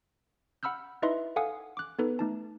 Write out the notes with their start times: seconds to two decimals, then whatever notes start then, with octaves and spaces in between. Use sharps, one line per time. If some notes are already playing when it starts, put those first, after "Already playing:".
0.63 F#5 B5 E6 F6 G6
1.02 D#4 E4 B4 D#5 E5 C6
1.36 A4 F5 F#5 G#5 D#6
1.77 D6 F#6
1.99 B3 D#4 A4 B4
2.19 A3 D#4 A5